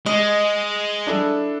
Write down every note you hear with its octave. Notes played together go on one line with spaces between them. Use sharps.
G#3 D#5
D4 E4 A4